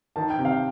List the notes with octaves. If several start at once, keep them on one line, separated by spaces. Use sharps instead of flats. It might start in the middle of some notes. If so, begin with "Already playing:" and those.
D#3 A5
G5
C3
F5